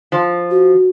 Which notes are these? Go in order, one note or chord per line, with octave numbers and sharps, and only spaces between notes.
F3
F#4